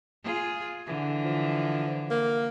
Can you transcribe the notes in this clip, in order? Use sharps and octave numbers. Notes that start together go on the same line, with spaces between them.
F4 G#4
D3 E3
F3
A#3